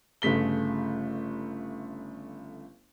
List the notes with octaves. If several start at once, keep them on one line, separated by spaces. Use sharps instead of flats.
G1 C#3 A3 B6 G7